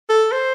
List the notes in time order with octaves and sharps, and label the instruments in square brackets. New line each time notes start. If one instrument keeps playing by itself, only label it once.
[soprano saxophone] A4
C5